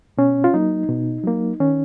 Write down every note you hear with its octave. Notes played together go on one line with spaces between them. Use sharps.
B2 C#4
F4
F#3 A#3 D#4
B2
F#3 A#3
D#3 C#4